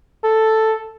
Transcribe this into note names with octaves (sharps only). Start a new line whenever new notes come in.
A4